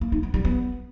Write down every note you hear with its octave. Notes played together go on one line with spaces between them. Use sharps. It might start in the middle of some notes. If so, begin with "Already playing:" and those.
A#3
D#4
B3
G3
B3